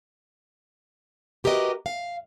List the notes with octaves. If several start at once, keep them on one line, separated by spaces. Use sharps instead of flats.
F#4 G4 A#4 B4 D#5
F5